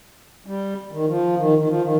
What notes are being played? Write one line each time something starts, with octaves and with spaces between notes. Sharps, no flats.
G3
D#3
F3
D#3
D#3
F3
D#3